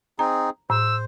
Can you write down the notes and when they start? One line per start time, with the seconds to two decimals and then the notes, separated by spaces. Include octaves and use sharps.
0.19 C4 D#4 G#4 A#5
0.70 A2 C5 E6